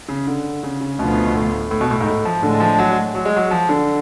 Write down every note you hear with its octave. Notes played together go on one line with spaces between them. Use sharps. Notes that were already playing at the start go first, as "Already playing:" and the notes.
C#3
D3
C#3
C#3
D2 B2 D3 F3 B3 F4
B2
A2
A2
B2
A2
G#2
A2
F3
A2 D3 G#3 D4
F3
F#3
F#3
G#3
F#3
F3
D3